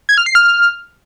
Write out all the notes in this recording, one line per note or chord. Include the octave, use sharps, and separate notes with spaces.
G#6
F6
C7
F6